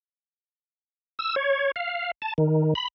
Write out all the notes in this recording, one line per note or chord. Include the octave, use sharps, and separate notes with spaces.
E6
C#5
F5
A5
D#3
B5